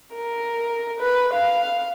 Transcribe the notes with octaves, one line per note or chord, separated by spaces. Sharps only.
A#4
B4
F5